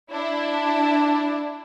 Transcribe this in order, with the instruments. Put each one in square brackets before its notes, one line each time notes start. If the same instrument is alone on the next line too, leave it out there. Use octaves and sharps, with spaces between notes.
[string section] D4 E4